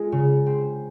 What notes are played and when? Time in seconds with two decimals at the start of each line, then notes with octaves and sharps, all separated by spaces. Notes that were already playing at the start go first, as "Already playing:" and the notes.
Already playing: G#3 F4
0.12 C#3
0.46 C4